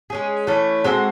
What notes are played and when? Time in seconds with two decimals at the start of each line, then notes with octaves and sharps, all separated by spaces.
0.10 G#3 C#4 G#4
0.47 E3 A3 C#4
0.84 G#3 C4 F#4 A4